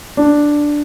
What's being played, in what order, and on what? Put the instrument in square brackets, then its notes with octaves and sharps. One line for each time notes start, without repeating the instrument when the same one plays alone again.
[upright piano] D4